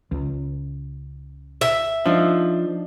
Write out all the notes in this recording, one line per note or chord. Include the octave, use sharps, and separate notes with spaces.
C#2
E5
F3 D4 D#4